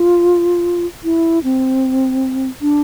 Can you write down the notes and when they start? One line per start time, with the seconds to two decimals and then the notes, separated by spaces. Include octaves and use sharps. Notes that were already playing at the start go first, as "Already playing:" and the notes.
Already playing: F4
1.04 E4
1.44 C4
2.61 D4